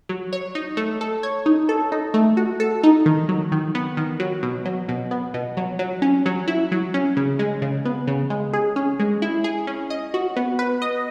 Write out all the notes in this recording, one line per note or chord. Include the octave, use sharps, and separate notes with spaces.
F#3
C#5
D#4
A3
A4
C#5
D#4
A4
D#4
A3
F#4
A4
D#4
D#3
F#3
D#3
B3
D#3
F#3
B2
F#3
B2
B3
B2
F#3
F#3
C#4
F#3
E4
F#3
C#4
C#3
G#3
C#3
B3
C#3
G#3
G#4
C#4
G#3
E4
G#4
C#4
D#5
F#4
B3
B4
D#5